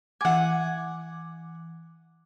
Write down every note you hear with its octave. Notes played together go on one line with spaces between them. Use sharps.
E3 F#5 G#5 D6